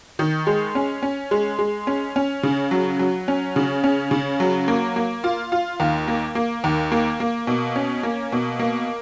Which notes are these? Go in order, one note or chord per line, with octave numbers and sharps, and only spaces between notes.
D#3
G#3
C#4
C#4
G#3
G#3
C#4
C#4
C#3
F#3
F#3
C#4
C#3
C#4
C#3
F#3
A#3
A#3
F4
F4
D#2
A#3
A#3
D#2
A#3
A#3
B2
C#4
A#3
B2
A#3